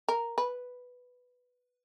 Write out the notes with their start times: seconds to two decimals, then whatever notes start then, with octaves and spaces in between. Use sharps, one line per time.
0.08 A#4
0.38 B4